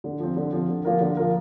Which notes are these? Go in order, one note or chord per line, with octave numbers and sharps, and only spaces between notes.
D3
F3 C4
D3
F3 C4
D3
F3 A#3 F4 A#4
D3
F3 A#3 F4 A#4